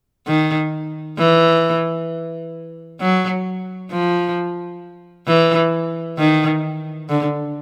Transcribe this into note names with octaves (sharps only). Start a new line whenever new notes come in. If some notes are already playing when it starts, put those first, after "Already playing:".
D#3
E3
F#3
F3
E3
D#3
D3